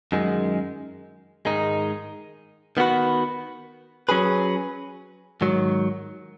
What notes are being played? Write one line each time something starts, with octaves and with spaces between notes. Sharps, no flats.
F#2 D#3 G#3
G#2 D#3 G#3 D#4
D#3 B3 F#4 B4
F#3 C#4 G#4 B4
G#2 D#3 F#3